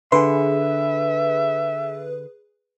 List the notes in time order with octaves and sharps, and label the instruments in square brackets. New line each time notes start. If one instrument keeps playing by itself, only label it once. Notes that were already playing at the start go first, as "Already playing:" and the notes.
[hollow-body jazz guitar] D3 C6 [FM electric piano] G#4 B4 [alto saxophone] E5